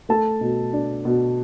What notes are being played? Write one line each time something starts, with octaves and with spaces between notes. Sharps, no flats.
A3 A4 A5
B2
D4
B2